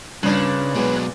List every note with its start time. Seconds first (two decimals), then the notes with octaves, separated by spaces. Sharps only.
0.23 G2 A#2 C#3 D4 B4 C#5 B5
0.75 B2 F#3 G#3 B3